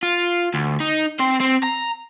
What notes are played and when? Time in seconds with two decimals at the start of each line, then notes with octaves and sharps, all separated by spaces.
0.03 F4
0.54 D2
0.80 D#4
1.20 C4 C5
1.40 C4
1.63 A#5